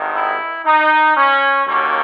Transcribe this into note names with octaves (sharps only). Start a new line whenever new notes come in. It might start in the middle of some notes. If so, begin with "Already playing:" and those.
Already playing: G#1 G2 D#3
E4
D#4
C#4
D#2 D3 F#3 A#3 C#4